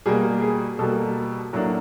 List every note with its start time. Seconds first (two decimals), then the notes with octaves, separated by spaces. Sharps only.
0.06 B2 G3 A#3 G#4
0.42 G#4
0.79 B2 G3 A#3 A4
1.53 A2 F#3 A#3 D4